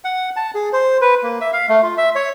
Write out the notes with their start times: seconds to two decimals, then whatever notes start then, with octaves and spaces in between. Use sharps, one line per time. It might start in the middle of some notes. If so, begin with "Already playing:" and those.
0.05 F#5
0.36 A5
0.55 G#4
0.73 C5
1.01 B4
1.23 A#3
1.41 E5
1.53 F5
1.69 A3
1.83 F4
1.98 E5
2.15 C#5